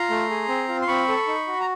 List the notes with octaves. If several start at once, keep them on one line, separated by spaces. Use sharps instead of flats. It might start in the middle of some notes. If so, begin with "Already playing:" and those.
Already playing: F4 A#5 C6
A3
G#4
C4
F4
C6
C4 B5 C#6
A4
D#4
F#4
A#5